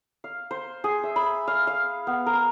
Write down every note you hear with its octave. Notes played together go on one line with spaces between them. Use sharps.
F5
C5
G#4
E5
B5
F5
F5
B3
A#4